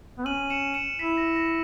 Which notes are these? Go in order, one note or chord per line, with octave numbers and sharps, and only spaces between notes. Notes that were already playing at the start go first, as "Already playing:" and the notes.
B3
C#4 D#7 F#7
C#7 E7
C#7 E7
E4 B6
A#6
A#6